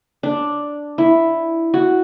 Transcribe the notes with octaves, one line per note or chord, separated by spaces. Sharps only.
D4
E4
F#4